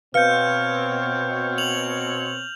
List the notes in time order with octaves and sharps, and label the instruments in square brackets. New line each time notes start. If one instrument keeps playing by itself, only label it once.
[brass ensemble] B2 C4 C#5 [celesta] B4 F5 C#7 [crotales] F6 G6
[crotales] F7 F#7